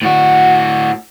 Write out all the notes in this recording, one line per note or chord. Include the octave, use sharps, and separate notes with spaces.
A2 F#4